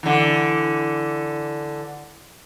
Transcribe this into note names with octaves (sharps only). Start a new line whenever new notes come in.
D3 E3